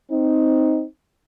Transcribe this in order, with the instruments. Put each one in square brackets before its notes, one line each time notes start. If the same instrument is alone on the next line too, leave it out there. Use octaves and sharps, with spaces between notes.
[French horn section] C4 D#4